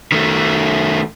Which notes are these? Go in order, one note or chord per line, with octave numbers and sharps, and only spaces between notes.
D#3 A3